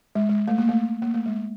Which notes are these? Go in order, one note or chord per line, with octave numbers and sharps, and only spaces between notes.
G#3
G#3
A3
A#3
A3
A#3
A3
G#3